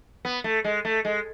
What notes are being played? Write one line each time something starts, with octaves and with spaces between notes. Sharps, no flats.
B3
A3
G#3
A3
G#3